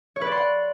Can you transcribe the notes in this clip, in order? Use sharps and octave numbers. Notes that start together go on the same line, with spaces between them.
C#5
B4
D5
C6
F#5